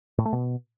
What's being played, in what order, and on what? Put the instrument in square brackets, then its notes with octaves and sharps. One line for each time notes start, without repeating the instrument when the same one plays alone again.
[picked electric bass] A2
A3
B2